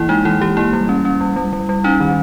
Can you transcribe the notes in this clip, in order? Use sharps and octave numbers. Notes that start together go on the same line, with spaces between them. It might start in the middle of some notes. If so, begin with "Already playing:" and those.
Already playing: E3 A#3 E4
G#3 D#4
E3 E4
E3 G4
A#3 E4
G3
C#4
C#4
G3
G3
G3
G3
C#4 D#4
D#3